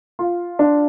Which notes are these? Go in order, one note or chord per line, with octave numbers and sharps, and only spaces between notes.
F4
D4